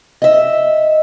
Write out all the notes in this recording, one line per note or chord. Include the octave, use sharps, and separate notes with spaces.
D#5 E5